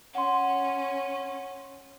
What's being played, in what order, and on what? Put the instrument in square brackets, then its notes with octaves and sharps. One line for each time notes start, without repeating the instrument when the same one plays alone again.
[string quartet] C#4 [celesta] F#5 C6